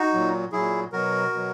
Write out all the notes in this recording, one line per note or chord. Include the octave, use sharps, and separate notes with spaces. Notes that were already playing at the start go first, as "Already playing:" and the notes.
Already playing: D#4 F#4
A#2 F#3
A#2 F#3 E4 G#4
B2 F#3 F#4 A#4
B2 F#3